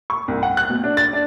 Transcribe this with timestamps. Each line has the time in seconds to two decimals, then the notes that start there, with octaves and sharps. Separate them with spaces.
0.10 C#6
0.28 C2
0.43 F#5
0.57 F#6
0.70 B2
0.84 D4
0.97 A6
1.13 D4